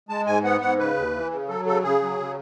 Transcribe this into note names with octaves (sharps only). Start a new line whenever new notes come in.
G#3 A5
G#2 G#5
B3 F#5
G#2 F#5
C#3 B4
D#2
E3
C#3
F#3 A4
C#3 A4
C#3 G#4
F#3
C#3